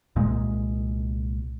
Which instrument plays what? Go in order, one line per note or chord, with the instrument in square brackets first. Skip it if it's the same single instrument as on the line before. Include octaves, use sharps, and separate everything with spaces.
[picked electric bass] C2 A#2 G#3